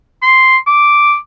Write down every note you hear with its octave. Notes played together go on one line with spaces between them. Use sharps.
C6
D6